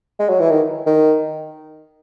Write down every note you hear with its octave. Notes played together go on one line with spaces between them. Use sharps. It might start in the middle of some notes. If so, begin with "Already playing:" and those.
G#3
F#3
E3
D#3
D#3